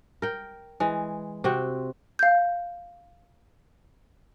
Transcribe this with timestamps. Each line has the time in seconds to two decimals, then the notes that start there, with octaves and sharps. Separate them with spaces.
0.22 A#4 G5
0.80 E3 G#3
1.44 C3 C4 F#4 G5
2.19 F5 G6